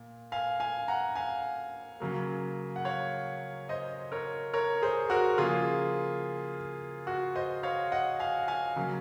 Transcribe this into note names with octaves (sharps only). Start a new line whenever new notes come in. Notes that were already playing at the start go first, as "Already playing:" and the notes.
Already playing: A#2
F5 G#5
F5 G#5
F#5 A#5
F5 G#5
C#3 F#3 A#3
F#5
C#5 F5
C5 D#5
A#4 C#5
A#4 C#5
G#4 C5
F#4 A#4
C#3 F3 A#3 F4 G#4
F#4
C5 D#5
C#5 F5
D#5 F#5
F5 G#5
F5 G#5
C#3 F#3 A#3